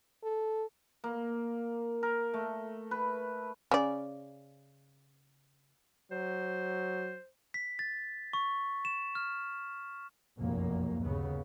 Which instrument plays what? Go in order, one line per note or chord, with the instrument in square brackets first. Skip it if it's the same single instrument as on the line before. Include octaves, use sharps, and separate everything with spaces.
[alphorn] A4
[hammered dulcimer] A#3
A#4
A3
B4
[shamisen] C#3 D5
[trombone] F#3 [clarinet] C5
[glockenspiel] B6
A6
C#6
E7
F6
[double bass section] F1 B1 F#2 A#3
G1 D#2 C#3 B3